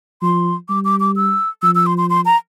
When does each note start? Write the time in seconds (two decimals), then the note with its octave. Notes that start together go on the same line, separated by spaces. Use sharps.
0.22 F3 C6
0.69 G3 D6
0.85 D6
1.00 D6
1.16 E6
1.62 F3 E6
1.75 E6
1.86 C6
1.98 C6
2.10 C6
2.25 A#5